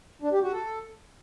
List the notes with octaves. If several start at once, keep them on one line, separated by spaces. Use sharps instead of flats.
D4
G4
F#4
A4